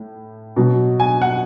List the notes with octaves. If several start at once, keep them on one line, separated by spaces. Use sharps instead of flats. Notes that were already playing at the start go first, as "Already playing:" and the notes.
Already playing: A2
B2 F#3
G#5
F#5